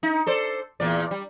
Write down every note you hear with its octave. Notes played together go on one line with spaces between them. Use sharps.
D#4
A4 C5 D5
E2 A#2 D5
G3